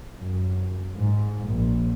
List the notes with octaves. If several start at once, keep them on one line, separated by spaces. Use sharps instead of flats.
F#2
G#2
A#1